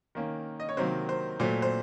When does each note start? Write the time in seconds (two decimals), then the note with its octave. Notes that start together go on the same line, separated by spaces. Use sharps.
0.15 D#3 A#3 C#4
0.60 D#5
0.69 C#5
0.77 C3 D#3 F#3 A#3 C5
1.09 C5
1.40 A#2 F#3 A3 C5
1.62 C5